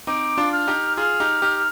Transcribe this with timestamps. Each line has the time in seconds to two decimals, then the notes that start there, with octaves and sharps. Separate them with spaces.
0.07 C4 D#4 D6
0.38 D4 F4
0.52 F6
0.67 D#4 G4
0.97 F4 G#4 F6
1.20 D#4 G4
1.42 D#4 G4